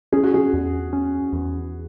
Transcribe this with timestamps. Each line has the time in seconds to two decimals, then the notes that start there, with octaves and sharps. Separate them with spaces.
0.13 C#4 G#4
0.23 F#4
0.34 G#4
0.53 E2
0.93 C#4
1.33 E2